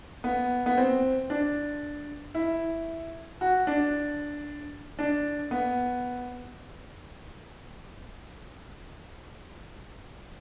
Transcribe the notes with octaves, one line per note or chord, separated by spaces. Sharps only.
B3
B3
C4
D4
E4
F#4
D4
D4
B3